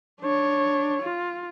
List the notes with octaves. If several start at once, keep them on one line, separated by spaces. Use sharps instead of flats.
D4 C#5
F4